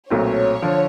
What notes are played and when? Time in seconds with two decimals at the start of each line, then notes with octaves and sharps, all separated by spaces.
0.10 B1 A#2 F#3 A3 C4 C#5
0.62 D3 F3